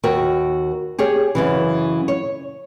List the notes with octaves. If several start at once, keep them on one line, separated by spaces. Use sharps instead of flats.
D#2 F#4 A#4 G5
G4 G#4 C#5
F#2 C#3 E3
C#5